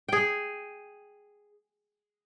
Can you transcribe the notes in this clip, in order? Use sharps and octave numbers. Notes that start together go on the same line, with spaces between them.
G#4 G5